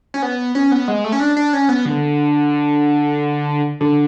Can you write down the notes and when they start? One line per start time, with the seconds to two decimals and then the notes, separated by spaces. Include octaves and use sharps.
0.14 C#4
0.22 B3
0.55 C#4
0.71 B3
0.88 G#3
1.04 A3
1.12 C#4
1.20 D4
1.37 D4
1.53 C#4
1.69 B3
1.85 D3
3.80 D3